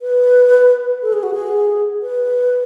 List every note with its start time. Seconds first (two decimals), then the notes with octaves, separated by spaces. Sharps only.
0.02 B4
1.02 A4
1.13 G#4
1.23 F#4
1.34 G#4
2.03 B4